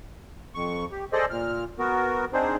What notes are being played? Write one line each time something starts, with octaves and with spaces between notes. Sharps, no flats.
F2 C#6
G4
G#4 A4 C5 D5 D#5
A#2 F6
B3 F#4 A#4
C4 D4 D#4 G#4 C5